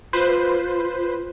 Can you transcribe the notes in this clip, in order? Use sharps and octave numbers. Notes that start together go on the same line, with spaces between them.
F4 B4 C5